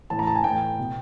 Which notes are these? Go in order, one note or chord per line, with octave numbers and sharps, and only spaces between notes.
A2 E3 A5
A#5
A5
G#5
A2 E3 G5
B2